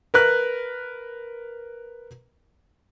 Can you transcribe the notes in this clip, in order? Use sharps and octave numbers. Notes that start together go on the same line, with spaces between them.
A#4 B4 F#6